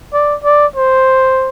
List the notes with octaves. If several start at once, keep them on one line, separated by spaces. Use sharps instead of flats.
D5
D5
C5